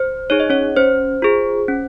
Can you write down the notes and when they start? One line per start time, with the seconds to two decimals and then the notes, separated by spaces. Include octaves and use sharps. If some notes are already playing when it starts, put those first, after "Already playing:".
Already playing: C5
0.30 D#4 G#4 C#5
0.40 D#5
0.50 C#4 C#5
0.76 C#4 C5
1.22 F4 G#4
1.68 C#4